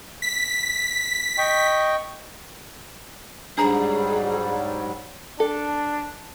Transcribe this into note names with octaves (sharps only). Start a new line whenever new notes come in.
B6
D#5 G5 C#6
G#2 F#3 G3 D4 G#4 A#5
D4 A4